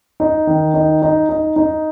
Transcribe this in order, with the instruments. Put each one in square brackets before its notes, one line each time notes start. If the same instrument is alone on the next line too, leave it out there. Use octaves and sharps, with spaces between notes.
[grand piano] D#4
D#3
D#4
D#4
D#4
D#4